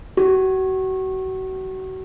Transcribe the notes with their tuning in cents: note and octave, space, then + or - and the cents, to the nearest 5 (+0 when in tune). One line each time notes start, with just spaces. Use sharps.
F#4 +35